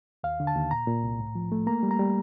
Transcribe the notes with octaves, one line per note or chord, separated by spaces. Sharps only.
D#2 F5
D3
A5
D#2
A#2 A#5
A#2
C2
A2
F3
A3
A#3 A#5
G3
A#5
G3